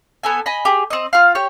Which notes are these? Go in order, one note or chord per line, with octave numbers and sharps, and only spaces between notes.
B3 A4 G#5
D#5 G#5 B5
G4 G#4
C4 D#5
F4 F5
G4 C#5